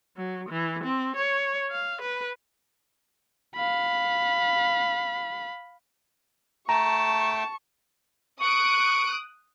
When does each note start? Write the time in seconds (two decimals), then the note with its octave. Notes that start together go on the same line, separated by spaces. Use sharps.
0.17 F#3
0.49 E3
0.84 C4
1.16 C#5
1.71 F5
2.02 B4
3.56 F5 B5
6.69 A3 G5 A5 A#5 C#6
8.40 C#6 D#6 F#6 D7